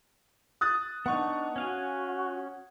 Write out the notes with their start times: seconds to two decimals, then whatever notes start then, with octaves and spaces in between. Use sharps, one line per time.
0.61 D#6 F#6 A6
1.06 B3 D4 D#4 F#5 C#6
1.56 C#4 F#4 F5 G#5